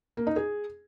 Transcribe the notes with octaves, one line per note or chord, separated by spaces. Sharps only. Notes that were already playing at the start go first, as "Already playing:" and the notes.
A#3
D#4
G#4